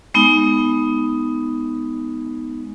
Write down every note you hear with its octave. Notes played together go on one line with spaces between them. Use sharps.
G#3 B3 D#4